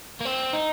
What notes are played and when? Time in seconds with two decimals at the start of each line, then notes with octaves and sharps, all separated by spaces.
0.21 A#3
0.25 C4
0.53 D#4